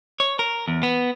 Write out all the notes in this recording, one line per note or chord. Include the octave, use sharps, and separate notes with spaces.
C#5
A#4
E2
B3